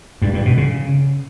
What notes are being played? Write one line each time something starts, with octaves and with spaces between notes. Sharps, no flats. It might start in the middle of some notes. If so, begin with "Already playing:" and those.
G2
G2
B2
C#3